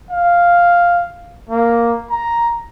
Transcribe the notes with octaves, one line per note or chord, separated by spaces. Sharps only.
F5
A#3
A#5